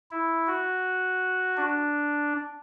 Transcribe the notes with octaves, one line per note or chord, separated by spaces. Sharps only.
E4
F#4
D4